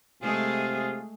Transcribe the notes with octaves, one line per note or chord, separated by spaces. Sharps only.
C3 G#3 A3 F4 G#4